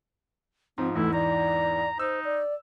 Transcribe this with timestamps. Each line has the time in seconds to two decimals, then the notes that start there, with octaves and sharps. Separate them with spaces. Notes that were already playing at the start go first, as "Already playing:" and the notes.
0.78 G#2 F3 C4
0.96 E2 G#2 E3 A3 E4
1.14 D5 A#5
1.99 D#4 C5 E6
2.24 D5